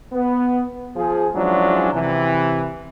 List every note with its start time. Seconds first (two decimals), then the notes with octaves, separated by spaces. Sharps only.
0.13 B3
0.96 F3 G#4
1.34 F3 F#3 G#3 C#4 D4 E4
1.93 C3 E3